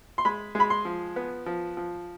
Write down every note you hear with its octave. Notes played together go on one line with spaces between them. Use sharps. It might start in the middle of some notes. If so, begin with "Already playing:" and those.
C6
G#3 B5
G#3 B5
C6
F3
B3
F3
F3